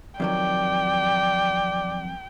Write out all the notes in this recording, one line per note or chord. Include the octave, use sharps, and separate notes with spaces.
F2 D#3 F#3 D5 G5